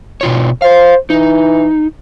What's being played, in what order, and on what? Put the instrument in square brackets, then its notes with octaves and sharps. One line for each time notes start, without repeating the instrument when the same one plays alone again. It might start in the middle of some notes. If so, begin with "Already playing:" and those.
[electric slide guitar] B2 F4 C#5
[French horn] C5 [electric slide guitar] F5
[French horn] E3 [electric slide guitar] D#4